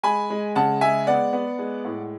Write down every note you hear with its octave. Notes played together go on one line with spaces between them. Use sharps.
G#3 G#5 B5
G#3
C#3 F#5 A5
G#3 E5 G#5
B3 D5 F#5
B3
G#3
A2